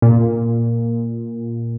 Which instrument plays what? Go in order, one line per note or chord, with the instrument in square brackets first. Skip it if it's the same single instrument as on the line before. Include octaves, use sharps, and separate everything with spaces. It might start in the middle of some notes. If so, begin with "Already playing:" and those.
[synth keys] A#2